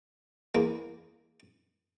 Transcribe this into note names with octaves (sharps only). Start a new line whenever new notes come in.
E2 A#3